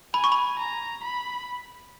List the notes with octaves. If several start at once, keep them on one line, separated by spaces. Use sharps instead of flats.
G#5 B5
C#6
B5
A#5
B5